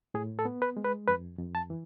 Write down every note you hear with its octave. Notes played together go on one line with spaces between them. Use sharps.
A2 G#4
A4
B3
B4
G#3
B4
F2 B4
F2
A5
E3